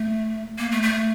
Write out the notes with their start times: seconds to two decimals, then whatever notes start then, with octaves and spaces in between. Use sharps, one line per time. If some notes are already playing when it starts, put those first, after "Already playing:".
Already playing: A3
0.59 A#3
0.71 A3
0.83 A3